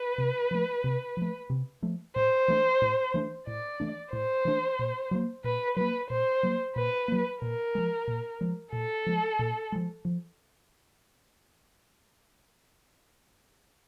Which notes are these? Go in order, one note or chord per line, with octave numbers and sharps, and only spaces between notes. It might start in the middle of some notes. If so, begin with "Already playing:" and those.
Already playing: B4
C3
F3 A3
C3
F3 A3
C3
F3 A3
A2 C5
E3 A3 D4
A2
E3 A3 D4
A2 D5
E3 A3 D4
A2 C5
E3 A3 D4
A#2
F#3 A#3
A#2 B4
F#3 A#3 B4
A#2 C5
F#3 A#3
A#2 B4
F#3 A#3
A#2 A#4
F3 G#3
A#2
F3 G#3
A#2 A4
F3 G#3
A#2
F3 G#3
F3